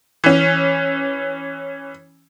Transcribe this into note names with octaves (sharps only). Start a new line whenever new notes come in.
E3 C#4